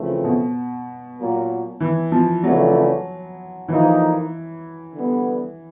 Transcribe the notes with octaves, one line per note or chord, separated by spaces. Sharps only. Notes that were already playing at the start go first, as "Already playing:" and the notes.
Already playing: F2 C#3 E3 A3 C4
B2
A#2 F#3 A#3
E3
F3
F2 C#3 E3 F#3 A3 D4
D3 E3 F3 A#3 D#4
D3 G3 B3